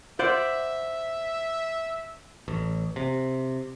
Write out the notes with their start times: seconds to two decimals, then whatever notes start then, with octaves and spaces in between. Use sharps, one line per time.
0.19 C5 D5 E5 F#5
2.48 A1
2.96 C3